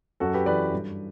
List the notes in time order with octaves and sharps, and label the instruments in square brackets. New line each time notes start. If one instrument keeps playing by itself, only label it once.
[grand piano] F#2 F#4 A4
G4 B4
E3 B4 D5
G2